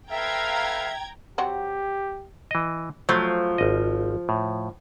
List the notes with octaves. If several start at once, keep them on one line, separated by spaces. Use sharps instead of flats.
A4 B4 E5 F5 G5 A#5 G#6
F#3 C4 F#4 G4
E3 D#5
F3 F#3 A3
G#1 D#5
A2